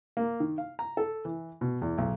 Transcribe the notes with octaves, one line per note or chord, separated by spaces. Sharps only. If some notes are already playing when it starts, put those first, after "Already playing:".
A#3
D#3
F5
A#5
A4
E3
B2
E2
B1